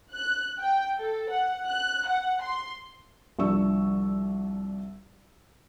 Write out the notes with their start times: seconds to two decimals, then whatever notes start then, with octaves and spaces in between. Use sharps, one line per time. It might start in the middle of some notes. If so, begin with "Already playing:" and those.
0.13 F#6
0.59 G5
0.98 A4
1.30 F#5
1.67 F#6
2.08 F#5
2.43 C6
3.39 C2 F3 D4 C#6 E6